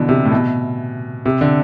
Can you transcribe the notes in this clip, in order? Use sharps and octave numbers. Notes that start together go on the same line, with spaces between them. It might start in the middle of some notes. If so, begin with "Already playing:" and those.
Already playing: B2 D3 E3
C3
A2
B2
C3
D3